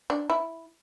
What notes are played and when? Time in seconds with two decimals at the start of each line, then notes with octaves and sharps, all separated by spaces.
0.10 D4
0.30 E4